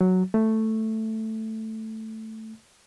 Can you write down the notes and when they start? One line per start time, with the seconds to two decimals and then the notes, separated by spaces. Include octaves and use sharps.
0.01 F#3
0.34 A3